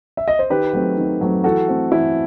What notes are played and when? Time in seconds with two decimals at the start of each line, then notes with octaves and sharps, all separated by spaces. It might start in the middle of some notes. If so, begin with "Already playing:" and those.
0.17 E5
0.28 D#5
0.39 C5
0.50 D#3 G4 B4
0.73 F#3 A3 C4
0.98 D#3
1.21 F#3 A3 C4
1.44 E3 F#4 A4
1.68 A3 C4
1.92 E3 E4